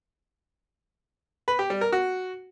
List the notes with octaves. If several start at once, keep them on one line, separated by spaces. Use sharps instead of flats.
B4
G4
G3
A#4
F#4